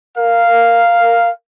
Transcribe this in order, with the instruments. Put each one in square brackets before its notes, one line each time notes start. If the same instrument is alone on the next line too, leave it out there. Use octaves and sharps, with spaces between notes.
[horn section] A#4 F5